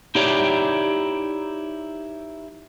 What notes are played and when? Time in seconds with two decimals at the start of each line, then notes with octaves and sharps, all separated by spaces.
0.15 D#4 E4 G4 C#5 D5